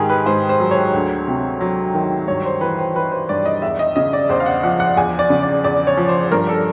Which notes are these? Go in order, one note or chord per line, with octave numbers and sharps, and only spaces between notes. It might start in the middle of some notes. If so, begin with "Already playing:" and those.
Already playing: G#2 D#3 G4 G#4
B4
G#2 C5
C5
F#3
C#5
D2
C3
F#3
D#3
G2 C#5
C5
E3 B4
C5
E3 B4
C5
G2 D5
D#5
E2 E5
D#5
C#3 D#5
D5
E2 C5
F5
F#5
F3 F#5
F#5
E2 G#5
D5
C#3
D5
E2 D5
C#5
F3
C5
G2 A#4
A4